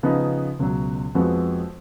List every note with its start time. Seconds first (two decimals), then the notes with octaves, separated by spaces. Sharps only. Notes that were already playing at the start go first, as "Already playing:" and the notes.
0.03 C#3 F3 B3 D#4
0.59 C#2 B2 F#3
1.15 F2 F3 G#3 B3 F#4